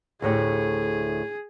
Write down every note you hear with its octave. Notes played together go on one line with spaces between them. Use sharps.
D2 A2 G4 G#4